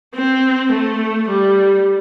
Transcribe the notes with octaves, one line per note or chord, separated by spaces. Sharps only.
C4
A3
G3